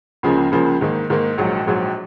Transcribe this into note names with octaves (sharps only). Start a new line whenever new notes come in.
C#2 C#3 F3 A#3
C#2 C#3 F3 A#3
G#2 D#3 A#3
G#2 D#3 A#3
A#1 G#2 F#3
A#1 G#2 F#3